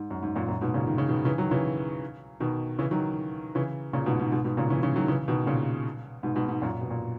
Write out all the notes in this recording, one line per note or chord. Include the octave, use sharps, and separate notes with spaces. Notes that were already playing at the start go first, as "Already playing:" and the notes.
Already playing: G#2
F#2
G#2
F#2 A#2
F#2 A#2
G#2 B2
A#2 C#3
D#3
C#3
B2 D#3
C#3 E3
D#3 F#3
C#3 E3
B2 D#3
C#3 E3
D#3 F#3
C#3 E3
A#2 C#3
G#2 B2
G#2
G#2 B2
G#2 B2
A#2 C#3
C#3 E3
C#3 E3
D#3 F#3
C#3 E3
B2 D#3
A#2 C#3
G#2 B2
G#2 B2
G#2
F#2 A#2
B2
A#2